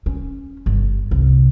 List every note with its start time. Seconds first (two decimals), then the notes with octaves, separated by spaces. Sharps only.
0.06 C#4
0.66 G1
1.11 C2